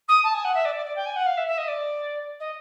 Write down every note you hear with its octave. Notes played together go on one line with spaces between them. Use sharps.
D#6
A5
G#5
F#5
E5
D5
D5
D5
G5
G#5
F#5
F5
E5
E5
D#5
D5
D#5